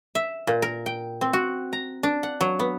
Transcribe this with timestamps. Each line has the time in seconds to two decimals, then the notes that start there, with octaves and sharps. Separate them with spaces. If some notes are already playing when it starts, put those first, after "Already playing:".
0.15 E5
0.47 A#2
0.62 A#4
0.86 G5
1.21 C4
1.33 F#4
1.73 A#5
2.03 D4
2.23 F#5
2.41 F#3
2.59 B3